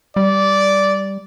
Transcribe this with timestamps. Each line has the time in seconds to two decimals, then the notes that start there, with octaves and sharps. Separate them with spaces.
0.16 G3 D5